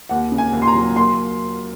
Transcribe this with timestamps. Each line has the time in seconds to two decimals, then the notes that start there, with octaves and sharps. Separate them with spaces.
0.09 D#2 F#5
0.32 C#3
0.38 G#5
0.53 D#2
0.62 C6
0.68 A#5
0.75 F#3
0.96 A#3 C6